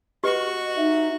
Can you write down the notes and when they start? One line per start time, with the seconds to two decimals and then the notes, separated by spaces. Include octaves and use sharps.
0.24 F#4 G4 B4 D#5 C#6
0.77 D#4 E5